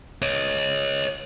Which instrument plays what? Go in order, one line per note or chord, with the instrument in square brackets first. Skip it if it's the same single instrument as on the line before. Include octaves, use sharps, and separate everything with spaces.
[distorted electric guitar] C#5 D#5